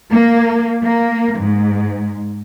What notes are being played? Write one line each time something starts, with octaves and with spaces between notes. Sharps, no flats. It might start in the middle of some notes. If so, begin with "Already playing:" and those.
A#3
A#3
G#2